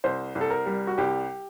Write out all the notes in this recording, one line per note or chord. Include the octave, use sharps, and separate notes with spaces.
C2 C5
C2
A4
A#4
G3
F#4
C2 G4